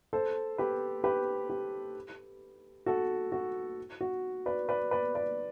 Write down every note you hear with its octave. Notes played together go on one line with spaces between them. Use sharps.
A4 C5
G4 B4
G4 B4
G4
F#4 A4
F#4
F#4
B4 D5
B4 D5
B4 D5
B4 D5